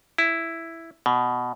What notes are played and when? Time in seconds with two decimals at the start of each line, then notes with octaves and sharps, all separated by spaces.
0.18 E4
1.06 B2